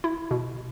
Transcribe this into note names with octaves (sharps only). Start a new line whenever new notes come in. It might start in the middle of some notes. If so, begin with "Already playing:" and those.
E4
B2